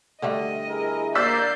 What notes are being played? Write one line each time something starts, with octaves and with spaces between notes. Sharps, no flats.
D3 G3 A3 D#5
E4 G#4 A#4
A#3 D5 E6 G6 B6 C7